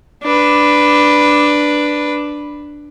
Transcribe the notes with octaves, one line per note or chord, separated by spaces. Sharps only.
D4 B4